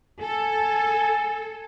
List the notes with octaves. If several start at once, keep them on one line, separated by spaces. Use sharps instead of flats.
A4 G#5